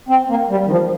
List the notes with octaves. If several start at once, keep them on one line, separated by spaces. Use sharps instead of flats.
C4
A#3
G3
D#3
F3